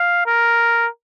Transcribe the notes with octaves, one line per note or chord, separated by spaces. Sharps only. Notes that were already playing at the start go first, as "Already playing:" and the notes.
Already playing: F5
A#4